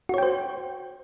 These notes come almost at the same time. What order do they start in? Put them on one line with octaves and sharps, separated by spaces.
F#4 C#5 G5 C5